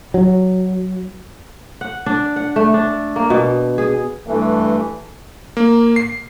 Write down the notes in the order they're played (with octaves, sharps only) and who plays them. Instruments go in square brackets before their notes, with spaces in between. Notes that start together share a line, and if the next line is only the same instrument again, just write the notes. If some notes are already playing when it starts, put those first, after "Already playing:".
[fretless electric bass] F#3
[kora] F#5
D4
F#5
A3
D4
A#3
B2
G#4
[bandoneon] G2 E3 [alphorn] A3
[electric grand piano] A#3
C7